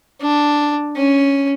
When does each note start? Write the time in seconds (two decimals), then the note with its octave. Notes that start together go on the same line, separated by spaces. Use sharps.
0.21 D4
0.96 C#4